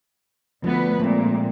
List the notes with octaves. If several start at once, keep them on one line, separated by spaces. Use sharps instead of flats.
D2 F3 B3 B4
A#2 G#3 A3 C4